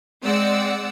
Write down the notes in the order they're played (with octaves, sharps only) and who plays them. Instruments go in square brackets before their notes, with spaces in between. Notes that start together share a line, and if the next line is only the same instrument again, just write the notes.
[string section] G#3 C4 D5 F#5 E6